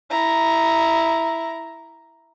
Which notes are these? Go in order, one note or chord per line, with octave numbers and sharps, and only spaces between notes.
E4 A#5